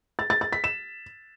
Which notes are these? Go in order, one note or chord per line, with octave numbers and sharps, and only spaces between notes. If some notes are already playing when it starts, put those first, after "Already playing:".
A6
A6
A6
B6
E7